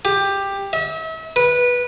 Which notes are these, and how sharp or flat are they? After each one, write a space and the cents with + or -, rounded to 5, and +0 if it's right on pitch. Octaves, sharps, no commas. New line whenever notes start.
G4 +10
E5 -40
B4 -15